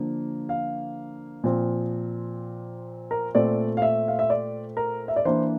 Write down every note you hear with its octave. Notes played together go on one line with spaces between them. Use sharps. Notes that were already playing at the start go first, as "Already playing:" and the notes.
Already playing: D3 F3 A#3 D4
F5
A#2 F3 C4
A#4
A#2 A3 C4 D5
F5
E5
F5
E5
D5
A#4
E5
D5
E3 A#3 D4 C5